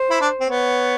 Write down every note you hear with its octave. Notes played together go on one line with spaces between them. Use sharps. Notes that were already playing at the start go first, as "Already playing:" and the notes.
Already playing: C5
E4
D4
C4
B3 C#5